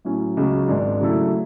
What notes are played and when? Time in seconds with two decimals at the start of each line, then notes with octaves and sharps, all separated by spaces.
0.05 A2 F#3 C#4 E4
0.37 C#2 C#3 F#3
0.68 G#1 G#2 G#3 D4
1.00 C#3 F#3 A3 E4 A4